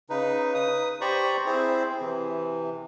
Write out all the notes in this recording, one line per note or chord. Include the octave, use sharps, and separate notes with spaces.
C#3 D#4 B4
B4 D#6
G4 C5 D5 A#5 B5 C#6
C4 E4 G#4 C5
C3 E3